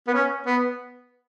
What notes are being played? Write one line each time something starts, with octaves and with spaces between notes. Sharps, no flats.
B3
C#4
B3